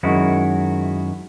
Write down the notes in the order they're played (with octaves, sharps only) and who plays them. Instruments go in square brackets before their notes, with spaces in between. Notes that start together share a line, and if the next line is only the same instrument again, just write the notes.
[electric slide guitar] F#2 D#3 G#3 E4 F#4